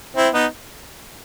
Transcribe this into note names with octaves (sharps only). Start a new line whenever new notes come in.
C4 E4
B3 D#4